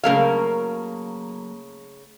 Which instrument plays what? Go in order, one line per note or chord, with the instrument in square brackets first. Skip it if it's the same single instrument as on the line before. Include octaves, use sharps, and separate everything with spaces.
[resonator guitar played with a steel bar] C#3 A3 F5 [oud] F#3 A#3 A#4